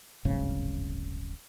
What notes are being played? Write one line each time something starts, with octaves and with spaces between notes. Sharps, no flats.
D1 G1 G#2 C#3